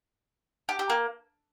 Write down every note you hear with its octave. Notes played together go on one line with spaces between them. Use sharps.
G4
G4
A#3